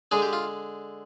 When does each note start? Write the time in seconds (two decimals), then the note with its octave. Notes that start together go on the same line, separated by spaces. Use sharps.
0.11 D3 G#3 D4 G#4
0.22 G4
0.33 F4